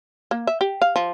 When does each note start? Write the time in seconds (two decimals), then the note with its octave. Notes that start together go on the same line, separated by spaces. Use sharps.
0.31 A#3
0.47 E5
0.61 G4
0.82 F5
0.96 F3